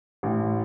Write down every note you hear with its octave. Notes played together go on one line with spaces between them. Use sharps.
A1